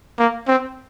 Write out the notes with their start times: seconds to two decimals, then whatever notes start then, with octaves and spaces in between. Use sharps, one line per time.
0.19 A#3
0.47 C4